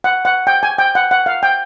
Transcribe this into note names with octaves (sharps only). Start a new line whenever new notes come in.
F#5
F#5
G5
G#5
G5
F#5
F#5
F5
G5